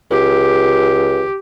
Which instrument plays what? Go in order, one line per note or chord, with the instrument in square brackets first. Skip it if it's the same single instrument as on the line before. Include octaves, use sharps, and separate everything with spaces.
[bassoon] C#2 [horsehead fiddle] G4